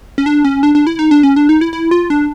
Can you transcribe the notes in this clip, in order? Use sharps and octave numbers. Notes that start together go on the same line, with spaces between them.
C#4
D4
C#4
D4
D4
E4
D#4
D4
C#4
D4
D#4
E4
E4
F4
D4